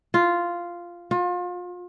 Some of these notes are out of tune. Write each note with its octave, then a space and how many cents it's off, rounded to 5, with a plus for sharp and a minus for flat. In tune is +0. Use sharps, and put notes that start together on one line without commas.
F4 -5
F4 +35